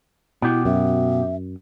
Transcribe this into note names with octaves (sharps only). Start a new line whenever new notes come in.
B2 E4 G4
F#2 E5